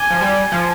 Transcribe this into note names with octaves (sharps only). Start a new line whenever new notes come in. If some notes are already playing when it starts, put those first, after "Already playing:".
Already playing: G#5 D6 G#6 D#7 G7
F3
G3
F3